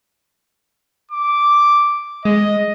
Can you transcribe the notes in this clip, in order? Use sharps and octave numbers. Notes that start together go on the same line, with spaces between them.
D6
G#3 D#5